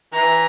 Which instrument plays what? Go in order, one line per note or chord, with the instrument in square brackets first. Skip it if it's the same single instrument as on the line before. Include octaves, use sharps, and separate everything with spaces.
[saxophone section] E3 [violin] A#5